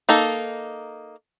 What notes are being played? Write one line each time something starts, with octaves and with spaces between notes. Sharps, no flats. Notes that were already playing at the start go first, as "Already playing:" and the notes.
A#3 D#4 A4